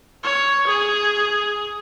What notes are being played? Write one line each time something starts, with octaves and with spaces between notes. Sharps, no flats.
C#5
G#4